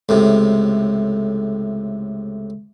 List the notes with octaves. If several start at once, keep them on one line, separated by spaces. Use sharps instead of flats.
C#2 A2 C3